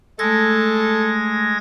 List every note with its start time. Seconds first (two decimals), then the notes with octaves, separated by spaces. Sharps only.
0.19 G#3 A3 A4 E6 G#6 A#6